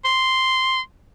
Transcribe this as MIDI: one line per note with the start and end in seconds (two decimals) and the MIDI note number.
0.05 0.81 84